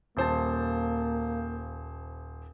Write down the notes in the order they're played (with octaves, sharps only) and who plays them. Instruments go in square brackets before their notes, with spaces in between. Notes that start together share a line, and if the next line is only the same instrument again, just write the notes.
[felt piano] D#1 C5 A5 [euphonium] A#3